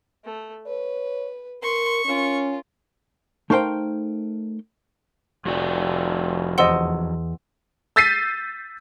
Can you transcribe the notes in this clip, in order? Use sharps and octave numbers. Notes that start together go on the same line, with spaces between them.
A3
B4 C#5
A#4 C6 C#6
C#4 F4 A#4
A3 D#4 A#4 C5 F5 G5
F1 F2 F#4 D5
E2 C5 D#5 F#5 C6 E6
E6 G6 A6 B6 C7 D#7